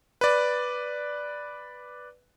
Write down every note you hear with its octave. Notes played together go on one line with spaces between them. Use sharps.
B4 D5